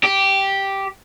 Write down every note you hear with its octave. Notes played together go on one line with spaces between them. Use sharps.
G4